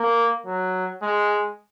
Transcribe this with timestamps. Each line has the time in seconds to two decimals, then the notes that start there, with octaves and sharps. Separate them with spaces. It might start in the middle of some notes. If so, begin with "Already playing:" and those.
Already playing: A#3
0.47 F#3
1.02 G#3